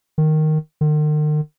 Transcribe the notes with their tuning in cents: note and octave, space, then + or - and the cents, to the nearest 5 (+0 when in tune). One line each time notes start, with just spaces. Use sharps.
D#3 -5
D#3 -45